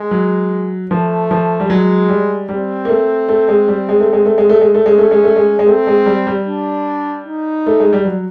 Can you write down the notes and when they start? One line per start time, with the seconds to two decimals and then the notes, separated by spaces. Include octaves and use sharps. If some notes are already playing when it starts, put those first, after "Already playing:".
Already playing: G#3
0.11 F#3
0.91 F3 A3
1.31 F3
1.60 G3
1.70 F#3 G#3
2.09 G3
2.49 G3 C4
2.85 A#3
2.88 A3
3.29 A3
3.48 G#3
3.68 G3
3.89 G#3
4.00 A3
4.13 G#3
4.25 A3
4.38 G#3
4.49 A3
4.61 G#3
4.74 A3
4.86 G#3 C#4
4.98 A3
5.11 G#3
5.24 A3
5.36 G#3
5.59 G#3
5.67 A3 C4
5.87 G#3
6.06 G3
6.27 G3
6.47 D4
7.25 D#4
7.66 A3
7.80 G#3
7.93 G3
8.05 F#3